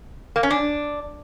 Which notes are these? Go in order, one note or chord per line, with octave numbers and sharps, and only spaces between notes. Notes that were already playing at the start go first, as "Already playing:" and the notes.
A#3
C#4
D4